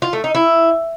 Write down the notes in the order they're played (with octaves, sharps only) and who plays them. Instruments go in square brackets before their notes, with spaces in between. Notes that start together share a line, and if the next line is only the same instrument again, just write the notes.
[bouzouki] F4
A3
D#4
E4